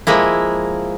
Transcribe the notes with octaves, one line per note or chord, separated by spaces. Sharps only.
F3 G#3 A#3 E4